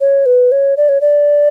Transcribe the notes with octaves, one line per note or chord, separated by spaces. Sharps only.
C#5
B4
C#5
D5
C#5
D5